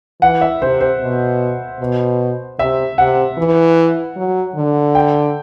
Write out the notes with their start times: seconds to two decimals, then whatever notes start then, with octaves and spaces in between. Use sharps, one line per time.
0.22 E3 F#5
0.41 E5
0.62 C3 C5
0.81 C5
1.01 B2
1.80 B2
2.59 C3 E5
2.98 C3 F#5
3.37 E3
4.17 F#3
4.56 D3
4.95 G5